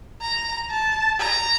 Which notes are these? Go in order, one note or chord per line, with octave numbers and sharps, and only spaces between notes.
A#5
A5
A#5